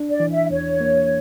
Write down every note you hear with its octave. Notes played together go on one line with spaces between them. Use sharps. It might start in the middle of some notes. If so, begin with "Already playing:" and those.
Already playing: D4
D5
E3
E5
E2 C#5
A#3